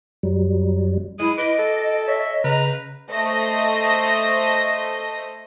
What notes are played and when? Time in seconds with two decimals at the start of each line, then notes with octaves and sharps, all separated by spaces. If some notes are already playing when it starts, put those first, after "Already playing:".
0.23 F#2 F#3 G3
1.19 G#3 E4 D#6
1.38 B4 D#5 D6
1.59 A4
2.07 C#5 E5
2.44 C#3 B4 A#5
3.11 A3 C5 D#5 A#6